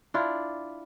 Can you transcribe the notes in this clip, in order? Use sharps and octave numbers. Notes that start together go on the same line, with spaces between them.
D4 E4 F4